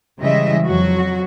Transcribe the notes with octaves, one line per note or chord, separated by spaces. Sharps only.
C#3 E3 G3 G#3 D#5 E5
F2 F#3 F#4